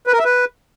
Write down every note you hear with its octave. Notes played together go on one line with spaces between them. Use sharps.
B4
A#4
E5
B4